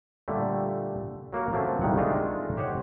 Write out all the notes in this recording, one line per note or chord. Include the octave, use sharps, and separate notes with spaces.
A#2 D3 G3 A3
F#3 A#3 F#4 A#4
F3 F#3 A3 A#3 C4 C#4
C2 D#3 G3 G#3 F#5
G#3 A3 D4 D#4 F4
G4 C5 C#5 D#5 F#5